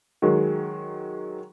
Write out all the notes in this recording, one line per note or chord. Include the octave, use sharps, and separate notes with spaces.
D#3 F#3 G#3